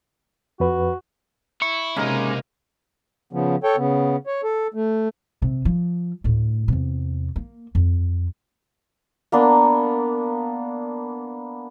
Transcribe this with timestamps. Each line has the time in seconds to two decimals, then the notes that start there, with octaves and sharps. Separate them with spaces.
0.60 F2 F#4 B4
1.62 E4 C#6
1.97 C#2 C3 G#3 A#3 C#4 D#4 E4 A#4
3.33 C#3 F3 B3
3.63 A4 C#5 G5
3.77 C#3 B3
4.27 C#5
4.43 A4
4.74 A3
5.42 C3
5.65 F3
6.24 D2 A2
6.68 E2 C3
7.36 A#3
7.75 F2
9.32 A#3 B3 D4